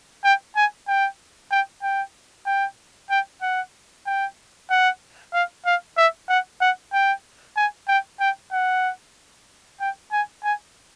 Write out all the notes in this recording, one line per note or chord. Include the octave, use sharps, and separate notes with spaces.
G5
G#5
G5
G5
G5
G5
G5
F#5
G5
F#5
F5
F5
E5
F#5
F#5
G5
G#5
G5
G5
F#5
G5
G#5
G#5